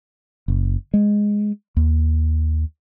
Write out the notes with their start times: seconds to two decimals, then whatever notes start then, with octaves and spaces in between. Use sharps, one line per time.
0.48 F#1
0.94 G#3
1.77 D#2